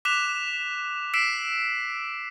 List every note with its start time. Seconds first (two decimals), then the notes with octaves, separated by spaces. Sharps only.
0.05 D6 F#6 B6 E7 F7
1.14 E6 B6 C7 D7 E7